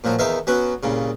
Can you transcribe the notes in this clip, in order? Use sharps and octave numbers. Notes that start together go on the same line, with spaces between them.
A#2 F3 F#3
E2 D#3 D#4 E5 F5
F#3 B3 C#4 F#4
C2 A#2 C#3